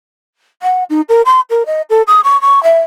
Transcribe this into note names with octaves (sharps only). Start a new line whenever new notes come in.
F#5
D#4
A#4
C6
A#4
D#5
A4
D#6
C#6
C#6
E5